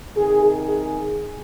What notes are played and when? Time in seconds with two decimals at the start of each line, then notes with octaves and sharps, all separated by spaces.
0.16 C3 D#3 G#4
0.45 G#4